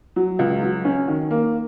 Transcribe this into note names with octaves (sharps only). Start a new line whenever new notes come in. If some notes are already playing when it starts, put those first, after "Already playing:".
F#3
C#2
F#3
C#4
D#3
A#3